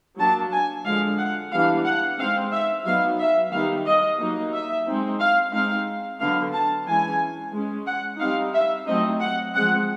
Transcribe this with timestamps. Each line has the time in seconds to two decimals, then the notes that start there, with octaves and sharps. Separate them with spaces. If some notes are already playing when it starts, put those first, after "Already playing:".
0.18 F#3 A#3 D4 A5
0.53 G#5
0.86 D3 F3 G#3 F5
1.18 F#5
1.52 E3 G3 B3 D4 F5
1.86 F#5
2.19 G#3 C4 D#4 F5
2.52 E5
2.85 F#3 B3 D#4 F5
3.20 E5
3.52 D#3 G3 B3 D#4 F5
3.86 D#5
4.20 F#3 A#3 D#4
4.53 E5
4.87 G#3 C4 D#4
5.20 F5
5.53 G#3 C4 D#4 F5
6.20 D3 F#3 B3 D4 F5
6.53 A5
6.87 E3 G#3 C#4 G#5
7.53 G#3 C#4
7.86 F#5
8.20 G3 C4 D#4 F5
8.54 E5
8.87 F#3 A3 C4 D#4 D#5
9.21 F#5
9.54 F3 G#3 C4 F#5